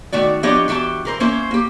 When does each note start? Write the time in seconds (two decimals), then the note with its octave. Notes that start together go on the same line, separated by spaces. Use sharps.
0.12 D#3 A3 F#4 D5
0.43 F3 B3 D4 G4 C#5 D#5
0.68 E3 F#4 G4 C5 A5
1.05 E3 A#4 C5
1.20 A#3 C#4 E4 C5
1.51 A#3 G4